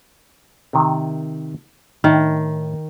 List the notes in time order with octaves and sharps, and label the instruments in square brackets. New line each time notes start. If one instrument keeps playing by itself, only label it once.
[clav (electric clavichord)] C3 D#3
[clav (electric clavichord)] A2 A5 [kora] D#3